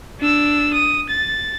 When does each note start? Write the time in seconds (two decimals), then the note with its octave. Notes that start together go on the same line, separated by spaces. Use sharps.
0.20 D4 E6
0.73 D#6
1.09 A6